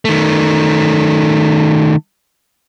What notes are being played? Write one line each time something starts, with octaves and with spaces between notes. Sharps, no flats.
D#3 A3